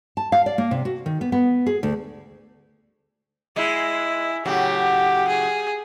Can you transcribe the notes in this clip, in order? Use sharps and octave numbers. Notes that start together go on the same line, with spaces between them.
A5
F5
D5
A#3
C3
F#4
D#3
B3
B3
G#4
D2
G#3 E4
A2 C#3 F#3 G4
G#4